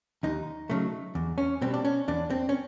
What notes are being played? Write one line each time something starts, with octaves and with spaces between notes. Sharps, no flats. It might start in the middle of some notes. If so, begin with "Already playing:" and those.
D#2 D#4
C#3 F#3 A3
E2
C#4
B2 G3 C4
D4
C#4
E2 D4
C4
C#4